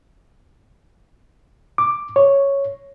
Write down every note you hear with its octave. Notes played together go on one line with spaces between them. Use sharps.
D6
C#5